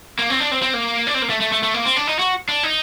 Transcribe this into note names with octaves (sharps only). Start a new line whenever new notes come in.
A#3
C4
D4
C4
C4
A#3
D4
C4
A#3
A3
A3
A3
A3
A#3
C4
D4
D#4
F#4
D4
D#4